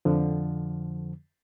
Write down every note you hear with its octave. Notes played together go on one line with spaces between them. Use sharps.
F2 D3 F3